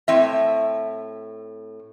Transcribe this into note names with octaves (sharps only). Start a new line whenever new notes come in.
A2 C4 E5